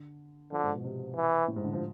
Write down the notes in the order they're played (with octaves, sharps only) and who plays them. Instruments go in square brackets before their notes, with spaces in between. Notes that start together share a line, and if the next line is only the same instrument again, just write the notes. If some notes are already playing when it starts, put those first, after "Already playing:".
Already playing: [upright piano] D3
[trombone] D3 [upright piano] F3
[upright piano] G#2
B2
C3
[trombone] E3
[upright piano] A2
G#2
D3
F3